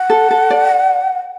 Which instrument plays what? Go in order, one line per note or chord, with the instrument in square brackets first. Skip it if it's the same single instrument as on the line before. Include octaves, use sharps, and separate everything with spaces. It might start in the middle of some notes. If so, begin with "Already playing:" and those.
Already playing: [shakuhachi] F#5
[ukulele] A4
A4
D5